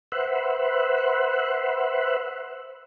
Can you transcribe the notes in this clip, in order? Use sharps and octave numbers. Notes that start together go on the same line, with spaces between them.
B4 C5 E5 F#5